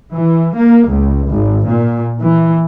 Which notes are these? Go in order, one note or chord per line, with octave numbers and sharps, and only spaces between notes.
E3
A#3
C#2
G#1
A#2
E3